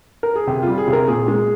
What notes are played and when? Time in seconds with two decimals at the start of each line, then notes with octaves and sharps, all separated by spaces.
0.23 A#4
0.35 G#4
0.47 C3 G4
0.62 F4
0.67 G3
0.78 G#4
0.88 C3
0.93 A#4
1.08 A#2 G#4
1.28 G#3